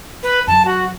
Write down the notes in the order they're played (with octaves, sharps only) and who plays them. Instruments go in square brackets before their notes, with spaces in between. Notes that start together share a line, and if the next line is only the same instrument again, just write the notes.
[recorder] B4
[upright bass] F#2 [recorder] A5
[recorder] F#4